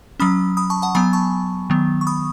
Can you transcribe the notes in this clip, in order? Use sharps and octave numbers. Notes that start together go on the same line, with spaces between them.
F#3 C#4 B5 D#6
B5 D#6
A5 C#6
F#5 A5
F#3 B3 G#5 B5
A5 C#6
D#3 F#3 B3
C#6
B5 D#6